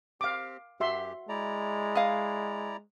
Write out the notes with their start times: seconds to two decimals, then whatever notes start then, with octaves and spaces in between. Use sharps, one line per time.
0.21 C4 G4 F5 D6
0.80 F#2 F#4 G4 E5 C6
1.29 G#3 E4 D5 A#5
1.95 D#5 F5 D#6